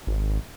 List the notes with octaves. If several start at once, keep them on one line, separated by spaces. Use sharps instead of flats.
G#1